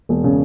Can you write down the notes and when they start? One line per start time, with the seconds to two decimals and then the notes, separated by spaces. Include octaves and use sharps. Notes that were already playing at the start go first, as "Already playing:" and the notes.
0.09 E1
0.24 C#3